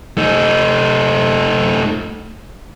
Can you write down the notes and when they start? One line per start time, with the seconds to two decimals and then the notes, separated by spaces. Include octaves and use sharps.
0.18 A3 D#4